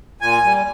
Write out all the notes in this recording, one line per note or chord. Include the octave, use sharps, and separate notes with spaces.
A#2 G#5
G3